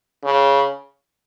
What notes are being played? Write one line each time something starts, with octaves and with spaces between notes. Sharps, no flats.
C#3